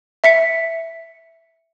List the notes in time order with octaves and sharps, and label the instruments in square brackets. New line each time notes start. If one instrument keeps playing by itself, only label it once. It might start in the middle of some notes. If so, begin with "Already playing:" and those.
[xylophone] E5 B6 C#7